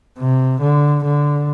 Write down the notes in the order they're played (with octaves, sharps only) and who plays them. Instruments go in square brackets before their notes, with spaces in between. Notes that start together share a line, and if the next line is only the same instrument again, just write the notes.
[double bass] C3
D3
D3